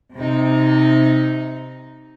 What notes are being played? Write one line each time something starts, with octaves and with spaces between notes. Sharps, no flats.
C3 D#4